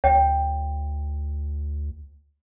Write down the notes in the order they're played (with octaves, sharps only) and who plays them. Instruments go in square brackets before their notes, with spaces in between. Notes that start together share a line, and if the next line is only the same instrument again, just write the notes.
[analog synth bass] D2 [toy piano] C#5 G5